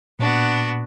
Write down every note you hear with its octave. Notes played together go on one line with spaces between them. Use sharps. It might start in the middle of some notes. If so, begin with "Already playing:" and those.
A#2 B3 D4 F#4